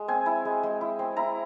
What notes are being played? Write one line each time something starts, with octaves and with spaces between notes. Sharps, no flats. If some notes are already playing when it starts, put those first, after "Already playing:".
Already playing: G#3
C4 G#5
E4
G#3
G#3
E4
C4
E4 A#5